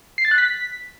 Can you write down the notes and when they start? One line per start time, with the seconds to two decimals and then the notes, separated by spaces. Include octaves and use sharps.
0.18 C7
0.25 A6
0.31 F#6
0.38 B6